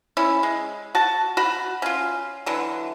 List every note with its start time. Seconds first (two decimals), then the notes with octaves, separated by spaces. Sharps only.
0.17 C#4 E4
0.43 G#3
0.95 F#4 A5
1.37 F#4 B5
1.82 C#4 F4
2.46 D3 E3 F#3